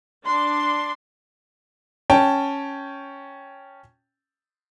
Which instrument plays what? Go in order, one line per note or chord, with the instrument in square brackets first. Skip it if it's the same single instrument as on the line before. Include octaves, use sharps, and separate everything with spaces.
[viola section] D4 C6
[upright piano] C#4 G5 A5